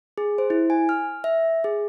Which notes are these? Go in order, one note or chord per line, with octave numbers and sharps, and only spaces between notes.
G#4
C5
E4
G#5
F6
E5
G#4